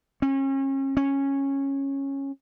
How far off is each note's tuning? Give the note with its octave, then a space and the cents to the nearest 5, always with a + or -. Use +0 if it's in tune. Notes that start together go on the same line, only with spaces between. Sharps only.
C#4 -35
C#4 -10